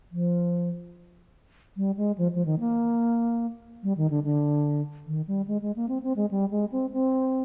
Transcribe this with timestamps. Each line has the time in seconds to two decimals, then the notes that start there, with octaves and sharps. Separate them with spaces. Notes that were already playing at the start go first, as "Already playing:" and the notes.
0.12 F3
1.77 G3
1.97 G#3
2.18 F3
2.35 F3
2.45 D#3
2.60 A#3
3.83 G3
3.97 D#3
4.10 D3
4.24 D3
5.07 D#3
5.28 G3
5.48 G#3
5.62 G#3
5.76 A#3
5.89 C4
6.03 C4
6.16 G#3
6.31 G3
6.51 G#3
6.72 C4
6.92 C4